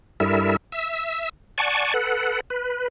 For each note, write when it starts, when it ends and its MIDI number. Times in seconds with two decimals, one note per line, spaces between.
0.20 0.56 43
0.20 0.56 55
0.20 0.56 64
0.20 0.56 69
0.20 0.56 70
0.20 0.56 76
0.72 1.29 76
0.72 1.29 88
1.58 1.94 74
1.58 1.94 78
1.58 1.94 80
1.58 1.94 81
1.58 1.94 85
1.94 2.40 69
1.94 2.40 71
1.94 2.40 78
2.50 2.88 71